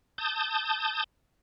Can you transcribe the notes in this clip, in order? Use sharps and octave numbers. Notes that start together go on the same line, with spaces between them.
A5 D#6 G6